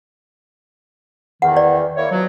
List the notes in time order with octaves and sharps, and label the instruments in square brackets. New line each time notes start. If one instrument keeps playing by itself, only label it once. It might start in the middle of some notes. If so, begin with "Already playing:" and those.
[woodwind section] E2 D#3 [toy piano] F#5
[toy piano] D5
[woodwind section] A#3 E4 C#5
B2 F3 F#3